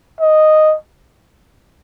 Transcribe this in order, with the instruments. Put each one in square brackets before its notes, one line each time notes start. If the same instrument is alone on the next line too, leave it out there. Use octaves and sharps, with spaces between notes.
[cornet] D#5